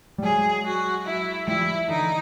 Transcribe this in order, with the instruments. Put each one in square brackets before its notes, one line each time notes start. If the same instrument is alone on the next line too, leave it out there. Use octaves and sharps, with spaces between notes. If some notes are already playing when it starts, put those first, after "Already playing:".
[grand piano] G3
[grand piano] F#3 G#3 [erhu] G#4
[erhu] F#4
E4
[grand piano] F3 G3 [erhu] E4
[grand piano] D3 E3 [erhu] D#4